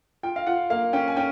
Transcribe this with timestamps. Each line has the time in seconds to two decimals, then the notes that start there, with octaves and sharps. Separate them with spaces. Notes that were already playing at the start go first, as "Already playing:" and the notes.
0.23 F4 G5
0.36 F5
0.47 F4 F#5
0.70 A#3 F5
0.93 C#4 G5
1.08 G#5
1.17 C#4 G5